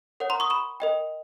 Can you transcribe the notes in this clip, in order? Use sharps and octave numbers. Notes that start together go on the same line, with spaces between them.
A#4 C#5 F#5
A#5 C6
C#6 D#6
B5 C#6
A#4 D#5 G5